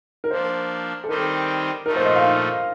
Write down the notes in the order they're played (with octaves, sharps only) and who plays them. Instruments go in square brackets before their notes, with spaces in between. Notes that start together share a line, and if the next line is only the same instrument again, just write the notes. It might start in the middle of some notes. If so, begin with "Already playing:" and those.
[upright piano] A#4
[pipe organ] F3 A#3 D4 [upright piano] C5
[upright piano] A4
[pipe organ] D#3 G3 C4 D#4 G4 [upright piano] A#4
[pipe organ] A#2 F3 A3 D#4 [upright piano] A#4
[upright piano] C5
D#5
F5